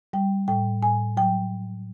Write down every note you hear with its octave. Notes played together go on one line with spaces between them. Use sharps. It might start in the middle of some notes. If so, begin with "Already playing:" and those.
G3 G5
A2 G5
A2 G#5
F#3 G5